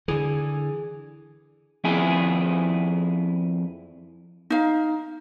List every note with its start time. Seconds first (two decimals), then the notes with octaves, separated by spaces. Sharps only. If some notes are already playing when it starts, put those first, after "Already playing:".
0.08 D3 E3 G#4
1.84 F2 E4 G#4
4.50 D#4 F5